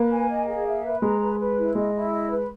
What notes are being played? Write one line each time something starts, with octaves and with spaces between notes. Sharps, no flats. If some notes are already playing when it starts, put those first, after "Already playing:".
Already playing: A#3 B4
G#5
D#5
G#4
E5
B4
G#3 A#5
B4
B4
E4
G#3 D#5
E4
D#5
B4